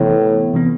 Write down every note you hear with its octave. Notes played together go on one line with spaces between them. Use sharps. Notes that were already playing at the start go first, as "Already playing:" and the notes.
Already playing: A2 C3 E3 B3
C3 E3 B3